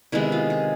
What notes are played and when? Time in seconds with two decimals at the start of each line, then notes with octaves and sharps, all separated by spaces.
0.12 C3 D#3 G#3 B3 E4
0.32 F4
0.50 G#4